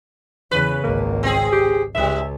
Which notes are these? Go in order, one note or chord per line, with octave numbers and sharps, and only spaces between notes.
E2 C#3 B4
G#1 C#2 A#3
C4 G#4
G4
C#2 G#2 G3 E5